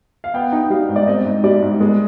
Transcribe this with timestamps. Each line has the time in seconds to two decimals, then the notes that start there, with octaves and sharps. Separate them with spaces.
0.24 F5
0.34 B3 G5
0.52 D#4
0.70 G3 F5
0.89 G#2
0.96 D5
1.08 C4 D#5
1.25 G#2
1.44 G3 D5
1.62 G#2
1.80 G#3